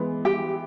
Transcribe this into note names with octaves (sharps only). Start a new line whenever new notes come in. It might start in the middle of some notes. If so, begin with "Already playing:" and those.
Already playing: E3 G#3 B3
G4